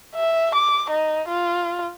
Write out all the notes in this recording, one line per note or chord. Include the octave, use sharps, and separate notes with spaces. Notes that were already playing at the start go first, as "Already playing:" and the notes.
E5
D6
D#4
F4